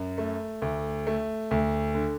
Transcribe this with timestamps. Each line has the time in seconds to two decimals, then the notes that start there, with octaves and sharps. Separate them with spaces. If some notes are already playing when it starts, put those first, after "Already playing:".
Already playing: F#2
0.18 A3
0.62 D2
1.07 A3
1.51 D2
1.95 D3